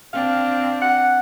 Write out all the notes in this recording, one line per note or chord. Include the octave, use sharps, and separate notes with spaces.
C4 D4 F5
F#5